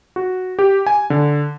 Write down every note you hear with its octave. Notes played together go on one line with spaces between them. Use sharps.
F#4
G4
G#5
D3